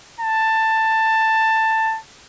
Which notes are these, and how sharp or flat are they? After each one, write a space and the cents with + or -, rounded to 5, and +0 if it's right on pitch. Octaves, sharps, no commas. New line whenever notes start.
A5 +15